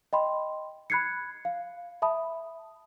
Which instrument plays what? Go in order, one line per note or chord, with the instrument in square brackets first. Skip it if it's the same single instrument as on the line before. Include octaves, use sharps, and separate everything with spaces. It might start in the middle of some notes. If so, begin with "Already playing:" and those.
[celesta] D#5 G5 B5 C6
B5 F#6 G#6 C7 C#7
F5
E5 A5 B5 D#6